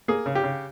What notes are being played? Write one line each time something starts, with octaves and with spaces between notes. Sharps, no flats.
A#3 G#4
C#3
G4
C#3